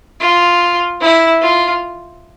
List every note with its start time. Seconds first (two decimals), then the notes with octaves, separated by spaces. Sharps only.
0.20 F4
1.01 E4
1.42 F4